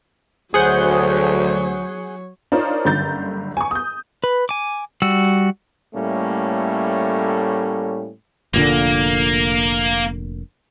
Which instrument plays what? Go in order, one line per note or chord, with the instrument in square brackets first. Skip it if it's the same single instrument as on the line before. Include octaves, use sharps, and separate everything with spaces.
[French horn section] D2 [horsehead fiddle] F#3 C#5 [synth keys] G#4 F#5 G6 [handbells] C5 D#6
[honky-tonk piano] D4 D#4 F4 A#4 C5 C#5
F#1 G2 D3 A#5 G6 A6
G#5 C#6
D#6 G6
[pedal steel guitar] B4
G#5 D6
G3 F#4 E6
[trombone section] A2 G3 A3 A#3 C#4
[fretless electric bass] F1 A#2 D3 [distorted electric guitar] A#3